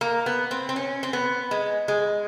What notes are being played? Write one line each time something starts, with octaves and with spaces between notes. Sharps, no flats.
A#3
B3
C4
C4
C#4
C4
B3
G#3
G#3